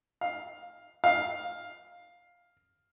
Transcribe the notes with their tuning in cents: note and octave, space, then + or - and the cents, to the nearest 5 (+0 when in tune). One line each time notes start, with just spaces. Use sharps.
F5 +10
F5 +10